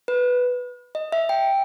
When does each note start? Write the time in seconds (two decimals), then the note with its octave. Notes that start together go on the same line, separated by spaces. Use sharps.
0.08 B4
0.95 D#5
1.12 E5
1.29 G5